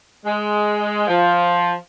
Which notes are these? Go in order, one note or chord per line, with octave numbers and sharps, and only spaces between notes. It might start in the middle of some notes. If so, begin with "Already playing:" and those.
G#3
F3